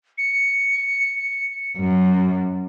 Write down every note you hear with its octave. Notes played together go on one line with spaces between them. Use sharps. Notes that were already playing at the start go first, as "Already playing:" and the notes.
C#7
F#2